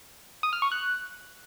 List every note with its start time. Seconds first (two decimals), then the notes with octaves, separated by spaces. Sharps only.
0.43 D#6
0.53 F6
0.62 C#6
0.72 F#6